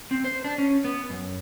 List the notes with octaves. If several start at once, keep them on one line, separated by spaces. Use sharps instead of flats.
C4
C5
D4
C#4
B3
F#2